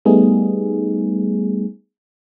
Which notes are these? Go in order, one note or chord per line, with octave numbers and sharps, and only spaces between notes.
G3 A3 B3 D#4 G#4